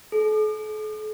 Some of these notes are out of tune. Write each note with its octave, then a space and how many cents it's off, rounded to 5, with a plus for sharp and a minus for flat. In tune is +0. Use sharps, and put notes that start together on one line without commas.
A4 -45